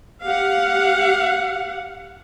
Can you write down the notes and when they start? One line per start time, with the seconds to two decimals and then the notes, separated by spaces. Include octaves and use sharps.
0.22 G4 F5 F#5